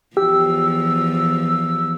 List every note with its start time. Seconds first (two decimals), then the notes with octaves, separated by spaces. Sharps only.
0.17 E2 F3 G4 E6